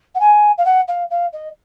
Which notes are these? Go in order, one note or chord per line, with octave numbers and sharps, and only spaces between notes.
F#5
G#5
F5
F#5
F5
F5
D#5